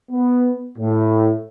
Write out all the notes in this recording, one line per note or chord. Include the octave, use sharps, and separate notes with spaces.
B3
A2